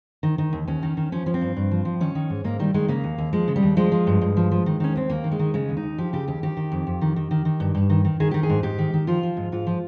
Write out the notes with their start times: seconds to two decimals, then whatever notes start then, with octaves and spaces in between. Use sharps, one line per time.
0.23 D#3
0.38 D#3
0.53 D#2
0.67 D#2 C#4
0.83 D#3
0.97 D#3
1.12 F3 C#4
1.26 F3 C#4
1.34 C4
1.41 G2
1.57 G2
1.71 F3
1.85 F3
2.00 D#3 C#4
2.15 D#3
2.30 G#2
2.44 G#2 A#3
2.59 D#3 G3
2.74 D#3 G#3
2.88 C#3 A#3
3.04 D#2
3.18 D#2
3.33 F3 G#3
3.48 C#3
3.56 G3
3.63 D#2
3.77 F3 G#3
3.92 F3
4.07 G2
4.21 G2
4.37 F3
4.51 F3
4.66 D#3
4.80 D#3 C#4
4.96 D#2 C4
5.10 D#2 A#3
5.24 D#3
5.31 G#3
5.39 D#3
5.54 C#3 G#3
5.69 D#2
5.77 D#4
5.83 D#2
5.98 F3 G4
6.13 C#3 G4
6.28 D#2 G4
6.43 D#3 G4
6.57 D#3
6.72 F2
6.87 F2
7.01 D#3
7.16 D#3
7.31 D#3
7.45 D#3
7.60 G2
7.75 G2
7.90 D#3
8.05 D#3
8.20 D#3 G#4
8.31 D#3 G4
8.43 G#4
8.50 G#2
8.63 G#2 G4
8.78 D#3
8.93 D#3
9.07 F3 F4
9.23 F3
9.37 G#2
9.52 G#2 F4
9.67 F3